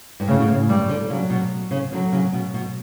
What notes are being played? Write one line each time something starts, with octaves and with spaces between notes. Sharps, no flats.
G2
A2 C#3
B2
A2
G2 G3
D3
C#3 F#3
B2
C#3
D3 F#3
C#3
B2
B2